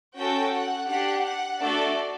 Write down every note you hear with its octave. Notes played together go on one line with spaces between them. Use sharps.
C#4 F#4 A4 G5
F#5
D4 G4 F#5
F#5
A3 D4 F#4 A4 D5